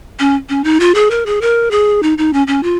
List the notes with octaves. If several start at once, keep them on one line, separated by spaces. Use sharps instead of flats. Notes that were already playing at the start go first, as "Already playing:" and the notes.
C#4
C#4
D#4
F4
G#4
A#4
G#4
A#4
G#4
D#4
D#4
C#4
C#4
F4